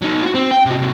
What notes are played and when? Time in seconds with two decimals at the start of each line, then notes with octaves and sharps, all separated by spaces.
0.02 F#3 D#4
0.23 F4 F#4
0.35 C4
0.51 G5
0.66 C3 F#4
0.79 C3 F#3